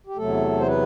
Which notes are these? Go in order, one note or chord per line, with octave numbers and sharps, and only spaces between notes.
G4
E2 C3 F#3 A3 A4
C5
B3 B4